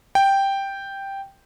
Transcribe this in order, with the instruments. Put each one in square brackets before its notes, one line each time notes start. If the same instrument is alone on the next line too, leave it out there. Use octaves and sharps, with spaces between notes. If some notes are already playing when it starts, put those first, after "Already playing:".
[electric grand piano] G5